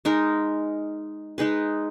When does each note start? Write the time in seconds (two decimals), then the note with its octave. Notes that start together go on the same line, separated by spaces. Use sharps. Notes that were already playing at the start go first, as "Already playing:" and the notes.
0.05 G#3 D#4 A#4
1.38 G#3 D#4 G#4 B4